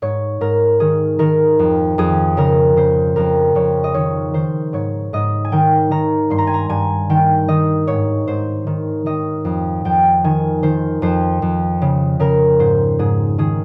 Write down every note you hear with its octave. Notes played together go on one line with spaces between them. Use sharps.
G#2 C#5
G#2 A#4
D#3 G#4
D#3 A#4
F2
F2 G#4
C#3 A#4
C#3 C5
F2 A#4
F2 C#5
D#5
D#3 C#5
D#3 C5
G#2 C#5
G#2 D#5
G#5
D#3 G5
D#3 A#5
G2 C6
A#5
G#5
A#5
G2 G#5
D#3 G5
D#3 D#5
G#2 C#5
G#2 C5
D#3
D#3 D#5
F2
F2 G5
D#3 G#5
D#3 C5
F2 C5
F2
C#3
C#3 A#4
G#2 C5
G#2 G#4
D#3 G#4